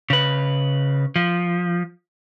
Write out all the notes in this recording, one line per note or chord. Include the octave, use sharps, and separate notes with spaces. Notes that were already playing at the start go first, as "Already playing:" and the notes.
C#3 B4
F3